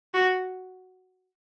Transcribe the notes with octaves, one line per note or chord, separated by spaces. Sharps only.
F#4